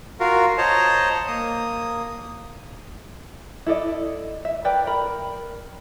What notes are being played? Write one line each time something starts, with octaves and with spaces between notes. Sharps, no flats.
F4 F#4 A#4 F5
C5 C#5 D#5 A5 A#5
A#3 D#6
E4 A4 D5 D#5
E5
A#4 B4 D5 G5
A#4 B5